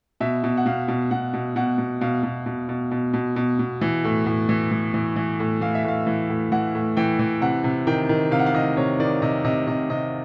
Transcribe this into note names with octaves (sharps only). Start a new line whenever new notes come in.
B2 E5
B2
F#5
B2 F5
B2
B2 F#5
B2
B2 F#5
B2
B2 F5
B2
B2
B2
B2
B2
B2
B2
E3
A2
A2
E3
E3
E3
E3
A2
E3 F5
E5
A2 F5
E3
A2
E3 F#5
A2
E3 G5
E3
C3 F#5
C3
D#3 G5
D#3
C3 F5
F#5
F5
D#3 D#5
C3 C#5
D#3 D5
C3 D#5
C3 D#5
C3 D#5
C3 D#5